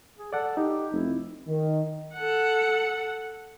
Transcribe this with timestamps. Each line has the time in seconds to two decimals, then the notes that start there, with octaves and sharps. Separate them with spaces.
0.18 G#4
0.33 A4 D5 F#5
0.57 D#4 G4
0.92 F1 E4
1.47 D#3
2.15 A4 F#5